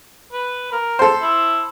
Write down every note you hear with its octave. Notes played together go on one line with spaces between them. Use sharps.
B4
A#4
A4 C5
E4